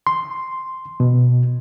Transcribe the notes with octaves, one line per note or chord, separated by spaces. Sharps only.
C6
B2